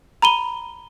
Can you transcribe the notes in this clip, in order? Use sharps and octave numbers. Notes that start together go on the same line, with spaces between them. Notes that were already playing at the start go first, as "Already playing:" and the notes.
A#5 B5 D#7 G7